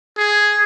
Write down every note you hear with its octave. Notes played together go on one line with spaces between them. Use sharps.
G#4